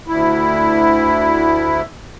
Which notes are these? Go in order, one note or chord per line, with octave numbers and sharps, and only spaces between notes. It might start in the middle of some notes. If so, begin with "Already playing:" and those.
D2 E4